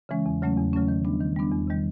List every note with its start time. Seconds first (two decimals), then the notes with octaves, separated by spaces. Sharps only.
0.09 C#3 E3 G#3 C#4
0.26 E2
0.42 C#3 F#3 A3 C#4
0.58 E2
0.73 C#3 F#3 A3 C#4
0.88 D#3
1.05 G3 B3 D4
1.20 D#3
1.36 G3 B3 D4
1.52 E2
1.67 C3 D#3 G3